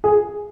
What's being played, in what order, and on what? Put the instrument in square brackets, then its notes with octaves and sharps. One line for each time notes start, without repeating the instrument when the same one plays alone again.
[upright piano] G#4